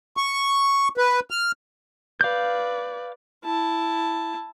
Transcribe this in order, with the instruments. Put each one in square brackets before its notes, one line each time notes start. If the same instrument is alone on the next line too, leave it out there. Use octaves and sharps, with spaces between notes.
[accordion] C#6
B4
F6
[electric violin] B4 D5 [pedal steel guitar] F5 G6
[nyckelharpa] E4 A5